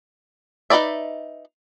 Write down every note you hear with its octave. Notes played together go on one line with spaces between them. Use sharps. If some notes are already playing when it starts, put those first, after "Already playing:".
D#4 G#4 B4 D5 E5